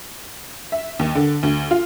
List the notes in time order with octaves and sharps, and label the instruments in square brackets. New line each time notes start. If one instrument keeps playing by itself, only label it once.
[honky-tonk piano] E5
D#2
D3
D2
F4